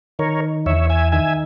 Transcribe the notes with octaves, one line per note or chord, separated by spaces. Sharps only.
D#3 A#4 C#5
E2 C#5 E5
E5 G#5
D#3 E5 G#5